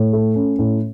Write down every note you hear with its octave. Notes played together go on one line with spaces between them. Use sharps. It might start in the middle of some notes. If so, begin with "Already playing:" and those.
Already playing: A2
A3
C#4
A2